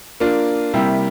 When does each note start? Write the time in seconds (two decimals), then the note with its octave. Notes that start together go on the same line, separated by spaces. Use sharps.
0.20 A#3 D4 F4
0.74 C3 G3 A#3 E4 G4